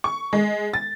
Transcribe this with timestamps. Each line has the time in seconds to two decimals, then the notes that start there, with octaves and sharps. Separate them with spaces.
0.04 C#6
0.33 G#3
0.74 A6